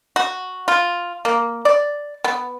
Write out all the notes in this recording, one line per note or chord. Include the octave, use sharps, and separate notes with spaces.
F#4
F4
A#3
D5
B3